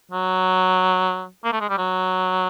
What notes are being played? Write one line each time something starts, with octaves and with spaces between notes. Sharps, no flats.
F#3
A#3
A3
G#3
G3
F#3